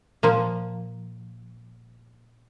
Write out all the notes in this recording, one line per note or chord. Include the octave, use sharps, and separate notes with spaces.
A#2 F3 A#3